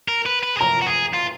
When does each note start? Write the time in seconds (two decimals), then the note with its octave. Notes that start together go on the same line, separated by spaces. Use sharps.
0.08 A#4
0.26 B4
0.43 B4
0.57 G#4
0.60 A#4 A#5
0.82 F#4
0.86 G#4
1.14 F4